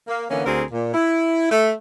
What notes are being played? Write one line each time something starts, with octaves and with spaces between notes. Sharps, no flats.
A#3
D3 E3 A#3 B3 C#4
D2 D3 C4 G#4 A#4
A#2
E4
A3